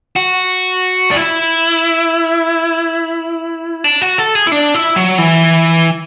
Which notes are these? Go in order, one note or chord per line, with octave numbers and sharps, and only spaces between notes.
F#4
D4
E4
D4
F#4
A4
G#4
E4
D4
E4
F#3
E3